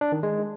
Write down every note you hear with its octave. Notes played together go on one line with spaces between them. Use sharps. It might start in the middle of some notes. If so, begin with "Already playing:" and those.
D4
D#3
G#3